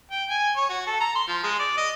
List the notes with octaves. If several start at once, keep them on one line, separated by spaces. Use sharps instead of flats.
G5
G#5
C#5
F#4
A4
A#5
C6
F3
G#3
D5
D#5